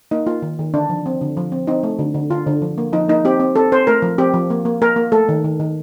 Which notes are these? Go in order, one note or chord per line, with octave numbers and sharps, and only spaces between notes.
A#3 D#4
A#3 F4
D#3
D#3
D3 D4
F3
C4
D3
F3
C4
C4 D#4
A3
D3
D3
D3 F4
D3
F3
A#3
F3 D#4
A#3 D#4
C4 G4
C4
C4 A4
C4 C5
A3 A#4
F3
C4 G4
F3
A#3
A#3
A#3 A#4
A#3
A3 A4
D#3
D#3
D#3